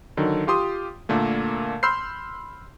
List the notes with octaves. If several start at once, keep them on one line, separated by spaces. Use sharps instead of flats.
D3 D#3 F#3
F4 G4 C6 D#6
A#2 D3 A3 A#3
B5 C6 E6 F6 G6 C7